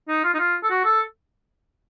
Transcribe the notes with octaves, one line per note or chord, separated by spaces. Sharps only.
D#4
F4
D#4
F4
A4
F#4
A4